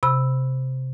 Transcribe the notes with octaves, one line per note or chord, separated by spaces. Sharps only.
C3 B5 E6